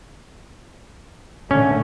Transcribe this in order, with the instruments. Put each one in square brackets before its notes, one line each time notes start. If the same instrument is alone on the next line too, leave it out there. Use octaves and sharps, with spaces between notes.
[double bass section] A#2 D3 A3 [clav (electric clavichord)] C#4